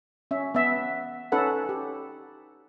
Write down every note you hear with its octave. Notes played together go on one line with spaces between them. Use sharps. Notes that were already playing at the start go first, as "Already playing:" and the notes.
C#4 E5
B3 E5
C#4 D#4 A4 B4 F#5
G4